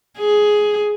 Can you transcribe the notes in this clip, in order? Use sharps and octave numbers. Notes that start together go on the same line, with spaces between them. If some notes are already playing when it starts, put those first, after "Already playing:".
G#4